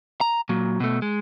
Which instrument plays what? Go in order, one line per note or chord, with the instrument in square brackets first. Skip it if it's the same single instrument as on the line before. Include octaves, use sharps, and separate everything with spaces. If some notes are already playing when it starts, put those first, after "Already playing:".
[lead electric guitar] A#5
A#2 F#3
B2 A3
G#3